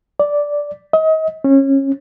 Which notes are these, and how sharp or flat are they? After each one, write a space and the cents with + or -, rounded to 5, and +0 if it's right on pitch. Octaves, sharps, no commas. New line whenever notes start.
D5 -5
D#5 +35
C#4 -25